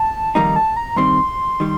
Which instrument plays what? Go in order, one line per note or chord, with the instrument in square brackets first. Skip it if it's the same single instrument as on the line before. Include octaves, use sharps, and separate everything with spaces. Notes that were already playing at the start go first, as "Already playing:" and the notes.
Already playing: [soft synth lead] A5
[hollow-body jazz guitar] F2 D#3 G3 A#3 D#4 [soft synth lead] A#5
[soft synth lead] A5
A#5
[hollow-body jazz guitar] G2 D#3 G3 C4 [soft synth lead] C6
[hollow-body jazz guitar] D#3 G3